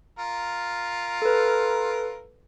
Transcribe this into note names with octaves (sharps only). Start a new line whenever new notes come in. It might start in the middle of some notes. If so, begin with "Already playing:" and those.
F4 A#4
A4 B4